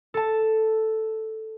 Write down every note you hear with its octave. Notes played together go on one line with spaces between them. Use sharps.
A4 A5